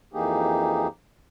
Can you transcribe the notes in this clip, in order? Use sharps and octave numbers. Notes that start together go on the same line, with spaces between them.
F2 E3 A#3 D#4 G4 G#4